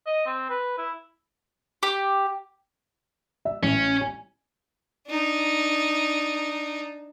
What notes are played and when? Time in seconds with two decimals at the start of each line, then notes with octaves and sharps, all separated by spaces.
0.06 D#5
0.26 C4
0.50 B4
0.78 E4
1.83 G4
3.45 E5
3.63 A1 C#4
4.01 G#5
5.08 D4 D#4